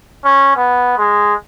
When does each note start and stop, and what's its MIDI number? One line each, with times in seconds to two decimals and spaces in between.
0.25 0.52 61
0.56 0.94 59
0.98 1.34 56